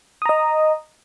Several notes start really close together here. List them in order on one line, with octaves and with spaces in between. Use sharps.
D#6 A#5 D#5